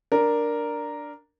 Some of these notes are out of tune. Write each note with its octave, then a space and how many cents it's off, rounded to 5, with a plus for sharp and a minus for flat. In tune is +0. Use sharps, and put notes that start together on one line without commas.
D4 +0 A#4 +0